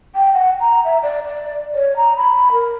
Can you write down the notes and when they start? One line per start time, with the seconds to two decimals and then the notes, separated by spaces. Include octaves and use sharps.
0.16 G5
0.34 F#5
0.60 A#5
0.85 E5
1.03 D5
1.24 D5
1.75 C#5
1.97 A#5
2.17 B5
2.52 A#4